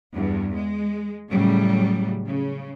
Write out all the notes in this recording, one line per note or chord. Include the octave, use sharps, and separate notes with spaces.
E2 G2
G#3
A2 C#3 F#3 G3
C#3